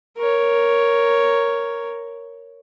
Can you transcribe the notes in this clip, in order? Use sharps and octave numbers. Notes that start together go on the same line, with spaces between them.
A#4 C#5